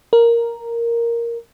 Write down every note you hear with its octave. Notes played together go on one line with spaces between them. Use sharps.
A#4